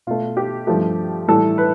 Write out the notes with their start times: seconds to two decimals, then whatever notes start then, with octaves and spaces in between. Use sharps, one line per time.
0.07 B2 A3 F4
0.37 G4
0.67 G2 F3 A3 G4
1.28 A2 E3 G3 A4
1.58 B4